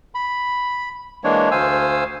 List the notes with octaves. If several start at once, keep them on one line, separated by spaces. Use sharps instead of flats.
B5
E3 G#3 A#3 D4 C#5
D2 C5 F5 G#5 E6